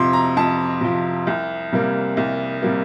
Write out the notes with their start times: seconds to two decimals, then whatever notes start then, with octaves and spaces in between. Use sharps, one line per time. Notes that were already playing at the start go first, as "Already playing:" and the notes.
Already playing: F2 C3 F3 C6
0.13 A#5
0.37 F2 A5
0.81 C3 F3
1.27 C2
1.72 C3 G3 A#3
2.17 C2
2.63 C3 G3 A#3